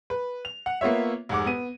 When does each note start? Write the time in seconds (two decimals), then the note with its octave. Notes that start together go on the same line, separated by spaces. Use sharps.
0.10 B4
0.45 F7
0.66 F#5
0.81 A#3 B3 F4 C#5 E5
1.29 F1 G#2 F#5 D6
1.46 B3 D#7